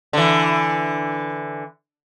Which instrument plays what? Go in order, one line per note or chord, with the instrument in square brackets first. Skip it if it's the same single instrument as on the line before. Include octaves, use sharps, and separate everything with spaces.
[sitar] D3 E3